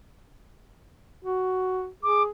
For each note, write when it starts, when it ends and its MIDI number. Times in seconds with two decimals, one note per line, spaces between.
1.25 1.88 66
2.03 2.29 68
2.03 2.23 86